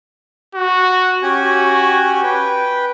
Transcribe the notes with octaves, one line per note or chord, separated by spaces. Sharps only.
F#4
C#4 F#4 G4 G#5
B4 G5